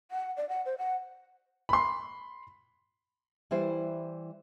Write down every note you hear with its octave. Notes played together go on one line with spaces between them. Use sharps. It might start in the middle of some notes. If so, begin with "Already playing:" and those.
F#5
D5
F#5
C5
F#5
B5 C6
E3 G3 E4 C5